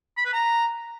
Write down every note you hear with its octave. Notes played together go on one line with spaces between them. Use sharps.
B5
B4
A#5